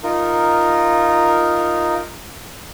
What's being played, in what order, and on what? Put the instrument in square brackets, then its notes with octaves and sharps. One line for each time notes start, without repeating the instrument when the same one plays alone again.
[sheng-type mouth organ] D#4 F4 A#4